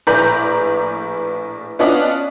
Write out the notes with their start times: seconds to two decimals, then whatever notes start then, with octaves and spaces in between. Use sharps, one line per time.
0.07 A#1 A2 B4 D5 A#5 G6
1.79 B3 C#4 D4 F4 D5 D#5